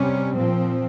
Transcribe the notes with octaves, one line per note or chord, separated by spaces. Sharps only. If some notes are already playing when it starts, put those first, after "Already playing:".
Already playing: C3 G3 C#4
A#2 F3 C4